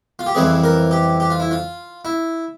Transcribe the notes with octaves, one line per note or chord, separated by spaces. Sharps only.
F4
G4
F2 E3 G3 C4 G#4
A#4
G4
G4
F4
E4
F4
E4